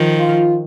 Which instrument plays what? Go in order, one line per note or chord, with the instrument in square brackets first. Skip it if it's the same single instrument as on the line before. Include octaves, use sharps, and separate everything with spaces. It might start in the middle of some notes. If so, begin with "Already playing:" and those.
Already playing: [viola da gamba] D#3 F3
[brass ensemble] F4